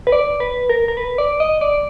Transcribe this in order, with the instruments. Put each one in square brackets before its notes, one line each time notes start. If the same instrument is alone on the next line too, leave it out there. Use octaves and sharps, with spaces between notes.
[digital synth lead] B4
D5
B4
A#4
A#4
B4
D5
D#5
D5